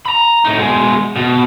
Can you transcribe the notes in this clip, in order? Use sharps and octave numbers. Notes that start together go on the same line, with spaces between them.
A#5 B5
A2 D#4
B2 G#3
B2